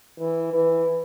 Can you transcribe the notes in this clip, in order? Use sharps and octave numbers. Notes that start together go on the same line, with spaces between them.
E3
E3